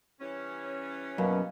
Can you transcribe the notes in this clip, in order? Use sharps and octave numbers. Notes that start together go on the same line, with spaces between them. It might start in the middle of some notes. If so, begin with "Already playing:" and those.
E3 G3 C#4
F#2 B2 A#3